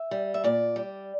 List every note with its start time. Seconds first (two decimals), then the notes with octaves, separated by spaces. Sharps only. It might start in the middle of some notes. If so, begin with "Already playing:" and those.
Already playing: E5
0.11 G3
0.34 E5
0.44 A#2 D5
0.76 G3